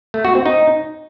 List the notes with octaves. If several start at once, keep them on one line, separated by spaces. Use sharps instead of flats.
A3
F#4
C4
D#4